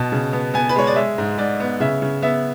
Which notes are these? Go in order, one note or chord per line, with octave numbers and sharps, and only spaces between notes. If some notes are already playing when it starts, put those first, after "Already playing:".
Already playing: B2 A5
C#3
B3
B3 G#5
B4
G#3 C#5
D5
G#3 E5
G#2
G#2 D5
B3
C#3 E5
C#3
B3 E5